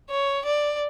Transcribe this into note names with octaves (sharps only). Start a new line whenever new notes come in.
C#5
D5